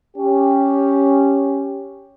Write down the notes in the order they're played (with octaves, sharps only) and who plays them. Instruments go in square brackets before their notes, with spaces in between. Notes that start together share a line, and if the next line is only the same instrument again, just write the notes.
[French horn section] C#4 G4